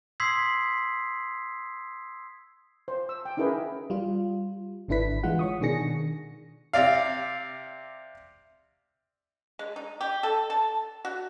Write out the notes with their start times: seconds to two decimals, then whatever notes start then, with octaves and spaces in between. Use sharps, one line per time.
0.20 C6 D#6 E6 G#6 B6 C7
2.88 C5
3.09 E6
3.25 G5
3.37 C#4 D#4 E4 G#4 A#4 B4
3.90 G3 F4
4.88 G#1 D3 D4 E4 B4 B6
5.23 E3 G#3 F4 F#5
5.39 C#5 C#6 D#6
5.61 B2 D#3 D4 G#4 A#6 C#7
6.73 C3 D5 F5
9.59 G#3
9.76 D#4
10.01 G4
10.23 A4
10.50 A5
11.05 F#4